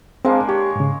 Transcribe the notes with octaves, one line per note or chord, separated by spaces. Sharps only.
G#3 A#3 C4 D4 G#4 F5
G4 C#5
G#2 C#3